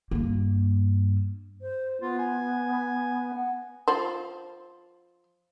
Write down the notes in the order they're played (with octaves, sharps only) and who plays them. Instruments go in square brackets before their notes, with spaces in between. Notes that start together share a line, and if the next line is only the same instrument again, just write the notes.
[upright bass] G2 A#3
[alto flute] C5
[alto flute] B3 [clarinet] F4
[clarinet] G#5
[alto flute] F#5
[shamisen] F3 C5